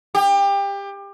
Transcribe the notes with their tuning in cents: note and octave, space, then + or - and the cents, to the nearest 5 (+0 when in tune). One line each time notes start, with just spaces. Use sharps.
G4 +25